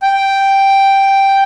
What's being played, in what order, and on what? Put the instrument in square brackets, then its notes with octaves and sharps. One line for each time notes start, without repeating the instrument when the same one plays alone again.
[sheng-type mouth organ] G5